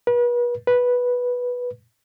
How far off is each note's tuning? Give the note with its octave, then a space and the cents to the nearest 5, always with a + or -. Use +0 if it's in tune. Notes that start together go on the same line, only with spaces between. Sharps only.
B4 -40
B4 -10